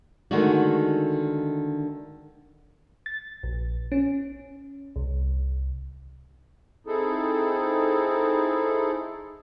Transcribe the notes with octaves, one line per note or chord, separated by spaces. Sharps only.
D3 D#3 G#3 A3 F#4
A6
A#1
C#4
C2
C4 D#4 E4 G#4 A4